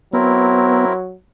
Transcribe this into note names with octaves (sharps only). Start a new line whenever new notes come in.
F#3 B3 C4 E4 A#4